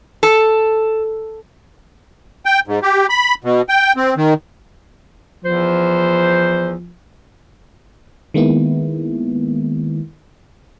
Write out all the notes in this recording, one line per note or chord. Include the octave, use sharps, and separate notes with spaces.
A4
G5
G#2
G4
B5
B2
G5
C4
D#3
E2 F3 C5
D#3 G#3 A#3 B3 E4